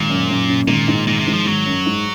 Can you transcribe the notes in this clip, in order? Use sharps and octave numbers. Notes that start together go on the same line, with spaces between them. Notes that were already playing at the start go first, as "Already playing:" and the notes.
Already playing: G#1 A#2
F#2
F#2
C#3
G#1 A#2
G#2
G#1 A#2
C3
G#2
F3
G#1 F#3
F#2
G#2